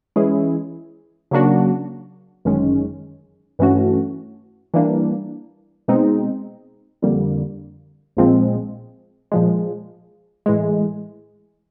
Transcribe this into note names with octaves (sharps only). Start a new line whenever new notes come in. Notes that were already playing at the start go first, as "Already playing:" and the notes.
E3 G#3 C#4 E4 G#4
C#3 F#3 A#3 D4 F#4
G1 F#2 D#3 G#3 C#4
G2 E3 A3 C#4 F#4
E3 G3 A#3 D4
B2 G#3 C4 D#4
F2 D3 G3 A#3
A#1 A#2 F3 G#3 C4
A#2 F3 G#3
A2 E3 G#3